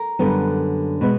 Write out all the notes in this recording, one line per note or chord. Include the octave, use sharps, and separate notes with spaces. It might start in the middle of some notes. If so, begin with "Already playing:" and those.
Already playing: A#4
F#2 D3 G3 B3
B2 G#3 B3